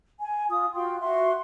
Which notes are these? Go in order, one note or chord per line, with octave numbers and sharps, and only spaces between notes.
G#5
F4 D#6
F4 F#4 G5 C6
F#4 E5 C6